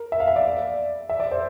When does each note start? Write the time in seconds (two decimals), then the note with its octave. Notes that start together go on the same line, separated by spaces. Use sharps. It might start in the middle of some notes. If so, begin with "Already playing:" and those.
Already playing: A#4
0.12 E5
0.20 F5
0.27 E5
0.36 D5
1.09 E5
1.20 D5
1.31 C5